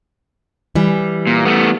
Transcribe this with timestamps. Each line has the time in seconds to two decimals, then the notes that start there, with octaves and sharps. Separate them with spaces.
0.75 E3 G3
1.27 A#2
1.45 A3 B3